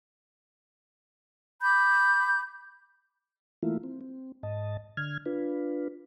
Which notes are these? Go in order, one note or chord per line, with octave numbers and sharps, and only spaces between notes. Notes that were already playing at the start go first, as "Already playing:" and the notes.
B5 D6 G6
E3 A3 A#3 E4 F4
C4
C4
G#2 D#5 A5
D3 F6 G#6
D4 F4 B4